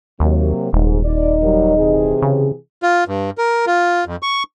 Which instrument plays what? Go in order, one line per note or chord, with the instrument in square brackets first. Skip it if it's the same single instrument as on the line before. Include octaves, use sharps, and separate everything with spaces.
[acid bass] D#2 [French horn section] C3 F#3 A#3
[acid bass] D#1 [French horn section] G#2
[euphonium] D#4 [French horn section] D5
[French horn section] F#3 G3 A#4
C3 E3 G#4
[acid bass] C#3
[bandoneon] F4
G2
A#4
F4
F2
C#6